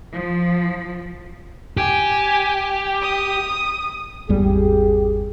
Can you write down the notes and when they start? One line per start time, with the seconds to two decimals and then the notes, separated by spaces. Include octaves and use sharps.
0.14 F3
1.77 G4 G#5
3.02 D#6
4.29 G#1 E2 G3 G4 G#4